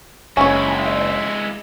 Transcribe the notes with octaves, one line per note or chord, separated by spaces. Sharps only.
F#1 G#3 C#4 E4 C#5